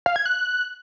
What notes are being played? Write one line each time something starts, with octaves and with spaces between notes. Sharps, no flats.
F5
G#6
F#6